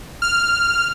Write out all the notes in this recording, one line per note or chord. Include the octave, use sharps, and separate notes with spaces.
F6